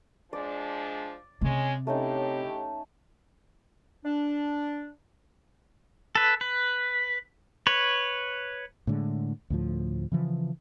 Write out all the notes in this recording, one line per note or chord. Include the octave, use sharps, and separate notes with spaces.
F3 G#3 D4 D5
C3 G#3 C#4
A2 A3 C#4 D#4 G4
D4
A4 B4
B4
B4 C#5
A2 D3 G#3
D2 A2 F3
C#3 E3 F3